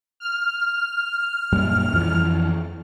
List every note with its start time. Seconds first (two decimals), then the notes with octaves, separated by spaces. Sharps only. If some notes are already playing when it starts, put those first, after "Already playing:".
0.20 F6
1.53 F#2 A#2 G3
1.93 F2 E3 F3